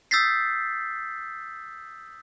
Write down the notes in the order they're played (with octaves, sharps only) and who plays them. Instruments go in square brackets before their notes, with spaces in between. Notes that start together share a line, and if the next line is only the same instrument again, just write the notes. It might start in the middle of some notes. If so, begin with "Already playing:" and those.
[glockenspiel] D#6 E6 G6 A6 B6 C7